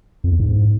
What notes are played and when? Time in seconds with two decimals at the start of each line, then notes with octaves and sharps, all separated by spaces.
0.24 F2
0.32 E2
0.40 G#2